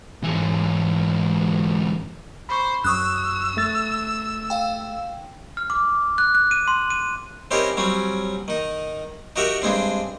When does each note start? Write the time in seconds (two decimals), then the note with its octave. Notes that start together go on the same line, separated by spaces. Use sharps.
0.24 G#2 E3
2.49 C5 B5 C#6
2.85 F#2 C#6 D#6 E6 F#6
3.57 A3 A6
4.50 F5 G5
5.57 F6
5.70 D6
6.18 F#6
6.35 F#6
6.51 D#7
6.68 C6
6.90 D#7
7.51 C4 C#4 D#4 E4 G4 A#4
7.77 F#3 G3 C4 C#4
8.48 D#3 D#4
9.36 D#4 F#4 G4 A#4 E5 F#5
9.62 G2 G#3 C4 D4